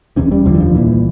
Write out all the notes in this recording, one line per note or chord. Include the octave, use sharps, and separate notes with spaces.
E1 E2 C3 C#4
G3
F1 D#2 D3 F3
E3
F3
C2 A#2 E3